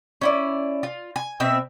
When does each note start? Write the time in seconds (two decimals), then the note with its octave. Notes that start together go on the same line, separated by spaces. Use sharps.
0.21 C#4 E4 D5
0.83 F4
1.16 G#5
1.40 B2 C4 E5